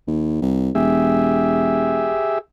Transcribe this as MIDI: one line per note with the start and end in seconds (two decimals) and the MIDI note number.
0.07 0.41 39
0.42 0.70 36
0.75 2.18 28
0.75 2.39 67
0.75 2.39 68
0.75 2.39 76